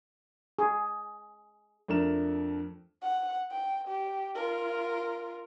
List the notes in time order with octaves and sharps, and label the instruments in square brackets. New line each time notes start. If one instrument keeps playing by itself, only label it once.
[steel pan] G#4
[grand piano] F2 A3 D4 A#4 E7
[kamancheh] F#5
G5
G4
F4 A#4